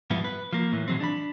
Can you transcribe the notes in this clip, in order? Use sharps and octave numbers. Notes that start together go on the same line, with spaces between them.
G#2 F3 G3 B3 E4
B4
F3 A#3
A2 E3
B2 E3 F#3 G#3 C4
D4 D5 B5